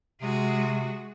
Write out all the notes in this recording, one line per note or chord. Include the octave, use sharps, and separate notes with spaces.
C3 G#3 F#4